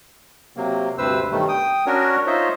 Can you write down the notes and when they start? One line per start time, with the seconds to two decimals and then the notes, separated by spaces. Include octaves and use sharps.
0.57 C3 F#3 A#3
0.98 D2 G2 C3 B4 C5 E6
1.31 G2 B2 D#3 F#3 G3 A3
1.48 G5 D#6
1.86 C#4 D4 F#4 A#4 C#5
2.27 D#4 F4 C5 C#5 D#5 E5